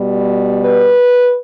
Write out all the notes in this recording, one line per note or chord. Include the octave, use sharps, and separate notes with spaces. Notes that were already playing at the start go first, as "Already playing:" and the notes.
Already playing: B2 G3
B4